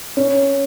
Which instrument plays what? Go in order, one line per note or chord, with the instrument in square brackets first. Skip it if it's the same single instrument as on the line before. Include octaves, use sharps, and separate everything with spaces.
[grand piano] C#4